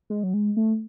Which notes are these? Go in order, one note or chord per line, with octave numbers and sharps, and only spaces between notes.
G#3
F#3
G#3
A3